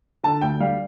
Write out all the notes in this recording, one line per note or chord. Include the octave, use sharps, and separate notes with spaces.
D3 A5
D2 G5
G3 F5